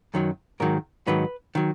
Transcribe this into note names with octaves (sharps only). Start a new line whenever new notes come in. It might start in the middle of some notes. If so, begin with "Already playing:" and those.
F#2 D#3 F#3
G#2 D#3 F#3 A#4
G#2 D#3 F#3 B4
D#3 F#3